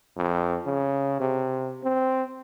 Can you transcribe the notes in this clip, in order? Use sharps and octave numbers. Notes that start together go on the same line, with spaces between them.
F2
C#3
C3
C4